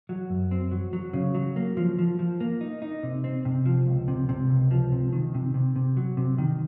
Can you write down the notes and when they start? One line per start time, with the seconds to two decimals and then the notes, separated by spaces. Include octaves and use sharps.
0.09 F#3
0.30 F#2
0.51 C4
0.71 F#3
0.93 F#3
1.13 C#3
1.35 F#3
1.56 A#3
1.77 F3
1.99 F3
2.19 F3
2.40 A#3
2.61 D#4
2.82 D#4
3.03 C3
3.24 C4
3.45 C3
3.66 F3
3.87 C#2
4.08 C3
4.29 C3
4.49 C#2
4.71 F3
4.92 C3
5.13 D#3
5.34 C3
5.54 C3
5.76 C3
5.97 F#3
6.17 C3
6.38 D#3